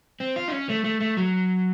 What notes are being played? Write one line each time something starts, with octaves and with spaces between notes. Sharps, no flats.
C4
F4
D#4
C#4
A3
A3
A3
F#3